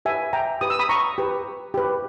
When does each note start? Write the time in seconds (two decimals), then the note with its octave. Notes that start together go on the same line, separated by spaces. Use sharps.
0.05 G4 B4 E5 G#5
0.33 G5 A#5
0.61 G4 B4 D#6
0.70 E6
0.79 B5 D#6
0.89 A#5 C#6
1.18 G4 B4
1.74 G4 B4